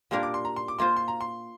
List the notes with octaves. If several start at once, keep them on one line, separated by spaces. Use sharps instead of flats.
A#2 G3 A#3 D4 A#4 C6
D6
C6
A#5
C6
D6
A#3 F4 C5 C6
C6
A#5
C6